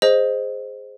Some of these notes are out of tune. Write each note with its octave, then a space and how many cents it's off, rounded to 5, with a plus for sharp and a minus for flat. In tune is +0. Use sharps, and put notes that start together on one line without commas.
G#4 +0 C5 +0 D#5 -5